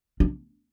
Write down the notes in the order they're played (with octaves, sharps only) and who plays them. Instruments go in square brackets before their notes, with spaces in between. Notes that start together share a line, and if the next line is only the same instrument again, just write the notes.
[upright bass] D4